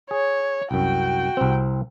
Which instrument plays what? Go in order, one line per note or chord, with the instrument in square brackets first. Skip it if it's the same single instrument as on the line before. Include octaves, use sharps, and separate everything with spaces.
[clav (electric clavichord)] G#4 [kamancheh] C#5
[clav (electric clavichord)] C2 F#2 [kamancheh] F#4 G5
[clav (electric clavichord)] C2 C4